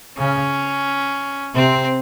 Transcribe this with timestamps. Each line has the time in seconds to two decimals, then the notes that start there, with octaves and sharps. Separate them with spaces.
0.17 C#3 C#4
1.54 C3 C4